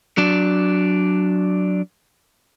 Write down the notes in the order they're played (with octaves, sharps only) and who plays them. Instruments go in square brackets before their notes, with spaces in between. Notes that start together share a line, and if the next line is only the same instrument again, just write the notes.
[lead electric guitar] F#3 D4